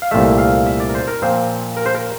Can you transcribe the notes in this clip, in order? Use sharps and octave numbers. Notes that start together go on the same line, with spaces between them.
F5
C2 A#2 A3 E5
F5
E5
D5
A#4
C5
A#4
A#2 F3 C4 C5
A#4
C5
A#4